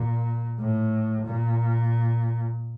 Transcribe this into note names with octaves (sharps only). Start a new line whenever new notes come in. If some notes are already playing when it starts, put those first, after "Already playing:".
Already playing: A#2
A2
A#2